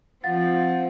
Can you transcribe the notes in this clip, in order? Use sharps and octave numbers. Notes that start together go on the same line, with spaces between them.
F3 C4 F4 F5 F#5 A6